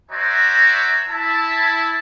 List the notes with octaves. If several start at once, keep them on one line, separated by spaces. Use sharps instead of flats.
F#4 C5 D5 E5 G#5 A#5
E4 A5